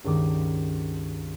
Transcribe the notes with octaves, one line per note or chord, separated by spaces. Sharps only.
C#2 G2 D#3 D6 D7